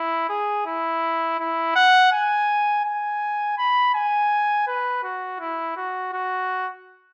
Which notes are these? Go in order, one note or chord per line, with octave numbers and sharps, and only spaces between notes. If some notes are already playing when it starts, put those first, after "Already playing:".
Already playing: E4
G#4
E4
E4
F#5
G#5
G#5
B5
G#5
B4
F#4
E4
F#4
F#4